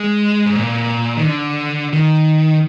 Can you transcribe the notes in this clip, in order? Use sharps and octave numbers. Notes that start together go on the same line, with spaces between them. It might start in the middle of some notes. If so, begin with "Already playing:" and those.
Already playing: G#3
G#2
A#2
D#3
D3
D#3